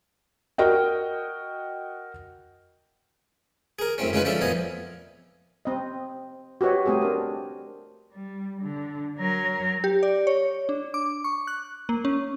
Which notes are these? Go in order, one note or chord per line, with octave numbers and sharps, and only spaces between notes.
F#4 A#4 D#5 G5
G#4 A#4
F#2 A2 C4 C#4
C#3 G#3 C#4 D#4 F4 B4
F3 C#4 D4 A4 E5
F2 A#2 F3 B3 D#5 G#5
C4 D#5
F#4 G4 B4 C#5 D#5
A3 C4 G4 G#4
D4 A#4
G3
D3
F#3 A#4
G4
D5
C#5
D4
D6
C#6
F#6
A#3
C#4